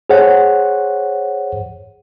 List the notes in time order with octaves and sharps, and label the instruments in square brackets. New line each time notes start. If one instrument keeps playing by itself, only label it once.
[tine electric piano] G#4 C5 C#5 F#5